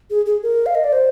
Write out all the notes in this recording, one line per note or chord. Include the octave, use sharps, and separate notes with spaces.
G#4
G#4
A#4
F5
D#5
D5
C5